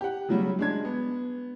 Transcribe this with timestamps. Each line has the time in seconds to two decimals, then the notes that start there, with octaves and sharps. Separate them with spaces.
0.01 G4 F#5
0.28 C#3 F#3 G3
0.59 G#3 D4 G#6
0.85 B3